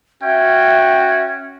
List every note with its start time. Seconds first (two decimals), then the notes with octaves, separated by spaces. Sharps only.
0.23 C#4 F#4 E5 G5